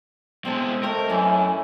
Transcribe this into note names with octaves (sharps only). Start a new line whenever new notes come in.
B2 G#3 C4 D#5 A5
A3 C4 A#4
F#2 E3 C#4